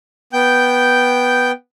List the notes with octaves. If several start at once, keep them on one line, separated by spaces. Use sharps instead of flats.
B3 G5 G6